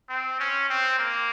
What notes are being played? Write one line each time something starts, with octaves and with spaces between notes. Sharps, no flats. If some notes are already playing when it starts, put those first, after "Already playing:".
C4
C#4
C4
A#3